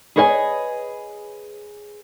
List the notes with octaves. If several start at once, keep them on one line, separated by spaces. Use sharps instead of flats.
G#4 B4 C#5 D#5 F#5 G#5